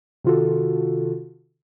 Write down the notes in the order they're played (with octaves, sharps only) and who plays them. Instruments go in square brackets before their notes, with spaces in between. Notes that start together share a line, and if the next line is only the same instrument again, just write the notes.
[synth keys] C3 D#3 F4 F#4 A4